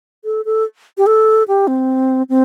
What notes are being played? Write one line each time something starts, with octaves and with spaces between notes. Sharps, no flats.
A4
A4
G4
A4
G4
C4
C4